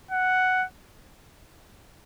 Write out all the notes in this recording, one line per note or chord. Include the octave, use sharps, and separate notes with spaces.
F#5